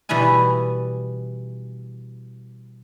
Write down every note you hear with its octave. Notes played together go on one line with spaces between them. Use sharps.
B2 E3 G3 E4 G#5